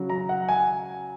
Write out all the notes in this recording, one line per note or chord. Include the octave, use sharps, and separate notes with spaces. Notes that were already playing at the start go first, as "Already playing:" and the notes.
Already playing: C#3 F#3
A#5
F#5
G#5